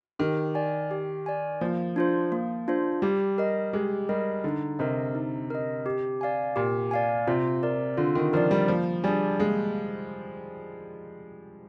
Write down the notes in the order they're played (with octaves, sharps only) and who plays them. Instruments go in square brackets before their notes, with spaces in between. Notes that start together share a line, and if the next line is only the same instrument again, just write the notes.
[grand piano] D#3 [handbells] G4
[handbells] D5 G#5
G4
D5 G#5
[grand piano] F3 [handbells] A#3
[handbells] D4 F4 C5
A#3
D4 F4 C5
[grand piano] G3 [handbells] G4
[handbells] A#4 D#5
[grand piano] G#3 [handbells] G4
[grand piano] G3 [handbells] A#4 D#5
[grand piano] D3 [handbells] D#4
[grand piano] C3 [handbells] A#4 D#5
[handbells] D#4
A#4 D#5
G4
D5 F5 G#5
[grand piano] A#2 [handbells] G4
[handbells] D5 F5 G#5
[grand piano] C3 [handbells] F4
[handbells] A#4 D5
[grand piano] D3 [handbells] F4
[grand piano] D#3
[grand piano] F3 [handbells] A#4 D5
[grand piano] G3
[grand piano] F3 [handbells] A#3
[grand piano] G3 [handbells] D4 G#4 D5 G#5
[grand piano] G#3 [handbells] A#3